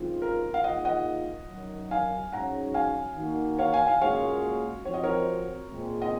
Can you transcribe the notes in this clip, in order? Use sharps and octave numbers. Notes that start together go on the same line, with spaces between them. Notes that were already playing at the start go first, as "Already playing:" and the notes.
Already playing: F#2 D#3 G#3 C4 F4
A#4
F5
G#2 D#3 A#3 F4 D#5 F#5
D#5 F#5
F#2 D#3 F#3
F5 G#5
G#2 F#3 C#4 F#5 A#5
F5 G#5
D#3 A#3 D#4 F#4
C#5 F5
F5 G#5
F5 G#5
A#2 G#3 C#4 F#4 C#5 F5
F3 C4 F#4 C#5
D#5
A#4 C#5
A#2 G#3 C4
D#5